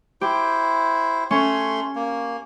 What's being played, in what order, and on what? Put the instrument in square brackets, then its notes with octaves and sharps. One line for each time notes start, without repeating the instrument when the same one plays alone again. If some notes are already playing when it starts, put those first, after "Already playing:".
[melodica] E4 C5 [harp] G4
[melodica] A3 C6 [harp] C#4
[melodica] A#3